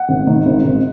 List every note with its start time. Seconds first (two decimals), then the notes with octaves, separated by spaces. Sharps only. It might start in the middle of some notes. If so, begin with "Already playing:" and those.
Already playing: F#5
0.09 G#1
0.27 D#3
0.46 G#1
0.65 G#1